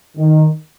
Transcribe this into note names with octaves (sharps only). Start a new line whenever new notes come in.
D#3